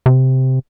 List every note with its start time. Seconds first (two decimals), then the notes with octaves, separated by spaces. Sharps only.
0.06 C3